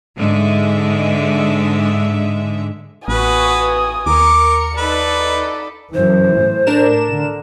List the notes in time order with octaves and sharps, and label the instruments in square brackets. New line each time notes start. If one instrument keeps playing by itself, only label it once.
[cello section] G#2 D3 G#3 E5
[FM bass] A1 [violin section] B3 F#4 [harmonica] B4 [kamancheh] G#5 D#6
[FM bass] D#2 [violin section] A#4 C#7 [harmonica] D6
[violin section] D#4 A4 [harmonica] B4 [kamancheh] D5 B5
[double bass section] F#2 E3 [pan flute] C5
[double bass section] A2
[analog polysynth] D4 A#4 E7
[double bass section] D3